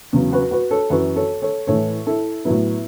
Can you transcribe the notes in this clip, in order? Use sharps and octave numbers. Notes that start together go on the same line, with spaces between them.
E2 C#3 F#3
F#4 B4
F#4 B4
A4 C#5
F#2 E3 F#4 B4
A4 C#5
A4 C#5
A2 E3 A4 C#5
E4 A4
A2 F#3 B3 E4